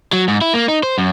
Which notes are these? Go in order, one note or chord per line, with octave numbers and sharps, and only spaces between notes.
F#3
G#2
E4
A#3
D#4
C5
F#2